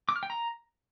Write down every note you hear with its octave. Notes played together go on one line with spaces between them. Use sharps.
D6
F6
G5
A#5